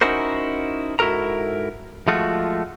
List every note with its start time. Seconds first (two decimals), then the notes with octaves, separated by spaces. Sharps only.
0.01 C#4 D#4 E4 F#4 A#4 C5
0.99 G#2 E4 F#4 A4 A#4 A#5
2.08 F3 G#3 A3 F4 F#4